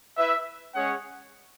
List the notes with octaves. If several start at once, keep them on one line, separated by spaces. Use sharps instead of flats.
E4 B4 E5
G#3 C#4 G#4 C#5 F#5